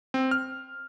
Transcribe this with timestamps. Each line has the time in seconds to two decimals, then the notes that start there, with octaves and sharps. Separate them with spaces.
0.14 C4
0.31 F6